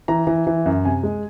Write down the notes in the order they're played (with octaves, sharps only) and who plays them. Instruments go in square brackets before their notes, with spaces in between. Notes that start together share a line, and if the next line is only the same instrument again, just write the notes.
[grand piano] E3 A#5
E3
E3
F#2
C3 G#5
G#3